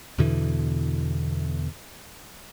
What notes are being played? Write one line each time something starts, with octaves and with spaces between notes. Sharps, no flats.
E2 B2 D3 E3